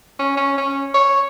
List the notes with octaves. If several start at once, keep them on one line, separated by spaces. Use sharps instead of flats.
C#4
C#4
C#4
C#5